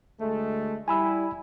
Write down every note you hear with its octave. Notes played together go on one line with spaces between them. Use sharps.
D2 G#3 A3
G3 E4 G#5 B5 E6